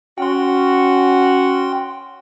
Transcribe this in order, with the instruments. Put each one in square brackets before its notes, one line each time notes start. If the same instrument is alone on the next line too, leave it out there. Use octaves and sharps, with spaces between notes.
[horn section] C#4 F#4 [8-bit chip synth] G5 C6